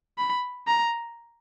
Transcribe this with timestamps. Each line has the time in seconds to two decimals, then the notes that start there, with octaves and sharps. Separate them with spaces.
0.18 B5
0.67 A#5